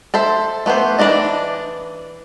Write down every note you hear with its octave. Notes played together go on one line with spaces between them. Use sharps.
A4 C5 E5
A3 B3 G4 C5
E3 D4 D#4 D5 D#5